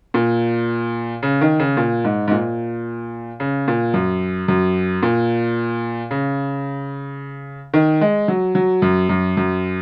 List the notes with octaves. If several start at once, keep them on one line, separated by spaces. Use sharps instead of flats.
A#2
C#3
D#3
C#3
A#2
G#2
G#2
A#2
C#3
A#2
F#2
F#2
A#2
C#3
D#3
G#3
F#3
F#3
F#2
F#2
F#2